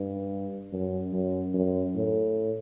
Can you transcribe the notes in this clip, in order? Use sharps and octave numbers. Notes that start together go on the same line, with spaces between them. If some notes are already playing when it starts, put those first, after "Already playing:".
Already playing: G2
F#2
F#2
F#2
A2